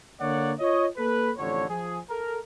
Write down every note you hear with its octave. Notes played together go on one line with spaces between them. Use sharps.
D3 A#3 C#5 D5 F#5
F4 C#5 D#5
A#3 A4 B4
A1 F2 D3 C#5
F3 G#4
A4 A#4